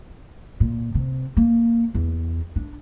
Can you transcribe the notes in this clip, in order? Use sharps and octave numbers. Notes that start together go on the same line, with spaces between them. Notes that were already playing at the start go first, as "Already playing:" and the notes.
A#2
C3
A#3
E2
D4